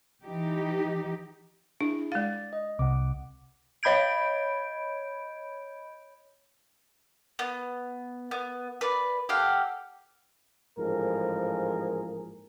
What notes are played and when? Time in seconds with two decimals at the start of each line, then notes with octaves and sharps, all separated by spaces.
0.24 E3 D#4 G4
1.81 D4 E4 G#4
2.12 G#3 D5 F5 A6
2.53 D#5
2.79 C2 F#5 D6
3.83 C#5 D#5 B5 G6 G#6 D7
7.39 B3
8.31 B3
8.81 B4 D5
9.29 G4 A4 F5 F#5
10.79 A1 G#2 F3 A#3 G#4 A#4